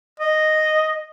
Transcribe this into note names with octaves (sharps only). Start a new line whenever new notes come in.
D#5